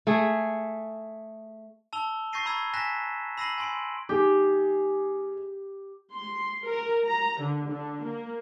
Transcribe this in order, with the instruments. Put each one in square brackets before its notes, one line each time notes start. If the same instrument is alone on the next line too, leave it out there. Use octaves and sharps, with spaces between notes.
[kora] A3 G#4
[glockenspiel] A5 E6 F7 G7
C#6 G6 A6 A#6 C7 D#7
A#5 B5 C#6 E6 G#6
G#5 F#6 A#6 B6 E7
B5 E6 A#6 C7 D#7 F#7
G#5 C6 D7
[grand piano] G3 D#4 G#4 [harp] G4
[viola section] C6
A#4
A#5
D3
D3
A#3